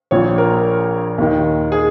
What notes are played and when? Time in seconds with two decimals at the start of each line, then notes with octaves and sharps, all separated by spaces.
0.11 A#1 A#2 F3 C#5
0.38 A#4
1.18 D#2 D#3
1.72 G#4